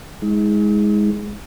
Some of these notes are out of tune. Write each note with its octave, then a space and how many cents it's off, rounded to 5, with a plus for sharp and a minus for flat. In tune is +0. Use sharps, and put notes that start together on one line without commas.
G#3 +0 D#4 +45